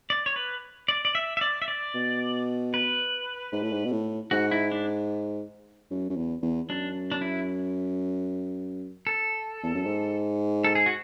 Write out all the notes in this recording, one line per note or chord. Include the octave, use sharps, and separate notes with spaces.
D5
C#5
B4
D5
D5
E5
E5
D5
E5
D5
B2
B4
G#2
A2
G#2
B2
A2
G#2 F#4
E4
D4
F#2
F#2
E2
E2
F#2 D4
D4
E4
A4
E2
F#2
G#2
A4
G#4
F#4